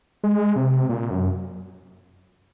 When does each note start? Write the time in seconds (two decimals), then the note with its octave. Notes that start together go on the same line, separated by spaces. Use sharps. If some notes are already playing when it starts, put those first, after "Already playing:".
0.23 G#3
0.56 C3
0.89 A#2
1.11 F#2